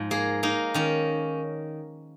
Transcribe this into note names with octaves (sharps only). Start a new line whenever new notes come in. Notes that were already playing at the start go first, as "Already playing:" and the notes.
Already playing: G#2 F3
A#3 G#4
A#3 D#4
D#3 C#4